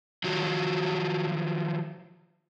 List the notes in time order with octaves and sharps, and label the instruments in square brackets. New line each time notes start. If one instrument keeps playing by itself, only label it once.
[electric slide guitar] D#3 F3 F#3 F#4